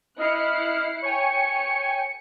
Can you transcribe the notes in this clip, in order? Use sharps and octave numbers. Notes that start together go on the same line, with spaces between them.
E4 D#5 F6 F#6 C7 C#7
C#5 G5 G#5 C#7